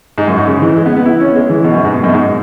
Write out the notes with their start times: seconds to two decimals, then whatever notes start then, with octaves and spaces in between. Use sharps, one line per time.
0.18 G#2
0.28 F#2
0.37 G#2
0.48 C#3
0.62 E3
0.76 G#3
0.86 B3
0.97 B3
1.05 E4
1.20 C#4
1.28 B3
1.35 G#3
1.50 E3
1.64 B2
1.74 F#2
1.85 G#2
1.94 B2
2.04 F#2
2.08 B2
2.14 G#2